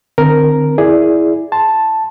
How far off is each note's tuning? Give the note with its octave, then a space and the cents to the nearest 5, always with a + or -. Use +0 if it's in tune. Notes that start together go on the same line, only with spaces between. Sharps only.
D3 +40 C4 -10 A#4 +0
E4 +0 G#4 +0 D5 +0
A5 +0 C6 +0